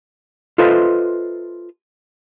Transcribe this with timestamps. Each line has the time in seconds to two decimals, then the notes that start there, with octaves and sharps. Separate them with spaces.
0.58 F4 A4 B4 C5 D#5 E5